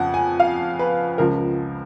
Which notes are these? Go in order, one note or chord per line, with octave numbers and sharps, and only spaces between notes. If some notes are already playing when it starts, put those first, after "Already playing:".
Already playing: F2 C#3 F3 F#5
G#5
F5
B4
C#2 C#3 F3 A#4